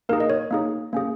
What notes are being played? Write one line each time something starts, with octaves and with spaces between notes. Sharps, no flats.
A#3 D#4 G#4 A#4
D#5
C#5
A#3 D#4 G#4
A#3 C#4 G#4